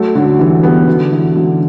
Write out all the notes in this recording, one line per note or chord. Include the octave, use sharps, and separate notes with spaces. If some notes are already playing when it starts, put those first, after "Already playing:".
Already playing: F#3 A3
D3 F#3
E3 G3
G3 B3
D3 F#3
E3
D3 F#3